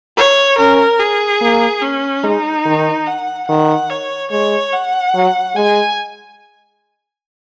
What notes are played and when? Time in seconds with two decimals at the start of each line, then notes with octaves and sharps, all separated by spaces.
0.17 C#5
0.58 C#4 A#4
1.00 G#4
1.41 A#3
1.82 C#4
2.23 G#3 D#4
2.65 D#3
3.07 F#5
3.48 D#3 F#5
3.90 C#5
4.31 G#3 C#5
4.73 F#5
5.15 F#3
5.56 G#3 G#5